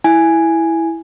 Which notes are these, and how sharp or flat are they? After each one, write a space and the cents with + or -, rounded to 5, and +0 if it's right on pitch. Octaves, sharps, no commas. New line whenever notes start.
E4 +0 G#5 +0